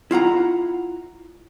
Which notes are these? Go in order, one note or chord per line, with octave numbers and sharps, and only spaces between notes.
E4 F4 F#5 A#5